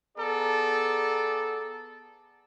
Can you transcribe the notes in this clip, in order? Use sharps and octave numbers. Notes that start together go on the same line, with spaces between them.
B3 G#4 A4 D5 A#5